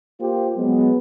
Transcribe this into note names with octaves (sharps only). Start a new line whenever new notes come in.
A#3 F4 G4 C5
F#3 G#3 B3